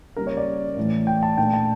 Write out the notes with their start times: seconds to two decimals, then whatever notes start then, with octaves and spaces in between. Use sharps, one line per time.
0.16 C#3 G3 A#3 A#4
0.27 C#5
0.37 D5
0.77 A2 E3 A3
1.07 G5
1.23 A5
1.38 A#2 A3 D4 G5
1.54 A5